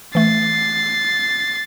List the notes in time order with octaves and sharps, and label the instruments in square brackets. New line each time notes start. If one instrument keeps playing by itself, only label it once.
[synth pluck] E3 A3 [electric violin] A6 C7